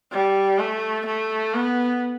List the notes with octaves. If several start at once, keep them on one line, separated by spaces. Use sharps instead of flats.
G3
A3
A3
B3